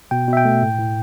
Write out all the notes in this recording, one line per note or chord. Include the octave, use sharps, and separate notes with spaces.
B2 G5
B2
E5
G5
A3
A2
A2